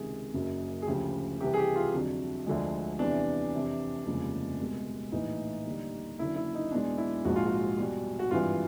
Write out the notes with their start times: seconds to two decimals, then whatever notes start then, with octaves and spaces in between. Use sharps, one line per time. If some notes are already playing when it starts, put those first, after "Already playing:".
Already playing: C#2 C3 D#3 G#4
0.33 F#1 F#2 C#3 F#3
0.82 G#4
0.87 D2 C#3 F3 G4
1.40 C2 C3 E3 G4
1.54 G#4
1.58 G4
1.76 F4
1.94 F2 D3 F#3
2.47 D2 D3 F3 G#3
2.99 E2 C3 E3 D4
3.53 F2 C3 E3
4.06 F1 D#2 C#3 F3 G#3
4.60 C2 B2 G#3
5.12 A#1 A2 E3 D#4
5.65 D#2 D3 G3
6.19 F#1 F#2 D3 E4
6.36 E4
6.55 D#4
6.71 E2 B2 G#3 D4
6.98 E4
7.25 A#1 G#2 F3 G#3 F#4
7.36 F4
7.46 F#4
7.78 E2 B2 G3
8.19 F#4
8.31 G#1 G2 E3 F4